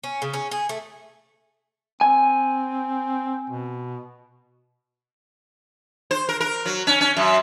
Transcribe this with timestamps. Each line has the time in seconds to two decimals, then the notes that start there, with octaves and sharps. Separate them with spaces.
0.04 C#4
0.22 C#3
0.33 C#4
0.51 G#4
0.69 A3
2.01 C4 G#5
3.50 B2
6.11 C5
6.29 A#4
6.41 A#4
6.66 F#3
6.87 C#4
7.01 C#4
7.17 F#2